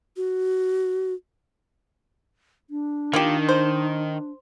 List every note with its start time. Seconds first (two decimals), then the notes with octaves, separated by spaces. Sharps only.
0.17 F#4
2.70 D4
3.13 D#3 A#3 F4 G4
3.49 C5